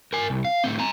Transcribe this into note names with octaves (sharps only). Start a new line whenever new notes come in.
A#4 G#5
C2
F5
A2 C4
G#5 A#5